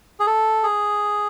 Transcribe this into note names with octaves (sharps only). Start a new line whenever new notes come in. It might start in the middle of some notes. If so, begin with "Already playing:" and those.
G#4
A4
G#4